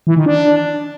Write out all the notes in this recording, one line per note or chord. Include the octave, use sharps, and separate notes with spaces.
E3
D#3
D4